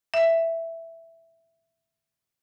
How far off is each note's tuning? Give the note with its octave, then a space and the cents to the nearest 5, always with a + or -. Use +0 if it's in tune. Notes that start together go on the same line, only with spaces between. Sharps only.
E5 +5